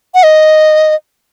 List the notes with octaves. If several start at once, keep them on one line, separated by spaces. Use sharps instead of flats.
F#5
D#5